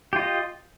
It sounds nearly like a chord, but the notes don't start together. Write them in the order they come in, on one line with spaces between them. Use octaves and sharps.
G4 F4 D#5